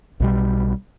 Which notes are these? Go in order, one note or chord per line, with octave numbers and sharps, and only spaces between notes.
B1 B2 G3